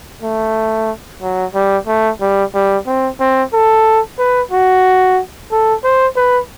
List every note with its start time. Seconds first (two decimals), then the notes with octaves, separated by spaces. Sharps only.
0.22 A3
1.22 F#3
1.54 G3
1.87 A3
2.21 G3
2.54 G3
2.86 C4
3.20 C4
3.53 A4
4.19 B4
4.51 F#4
5.52 A4
5.84 C5
6.17 B4